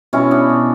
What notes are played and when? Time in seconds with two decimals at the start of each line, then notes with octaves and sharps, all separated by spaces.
0.13 B2 C#4 E4
0.31 B3 D4
0.49 B2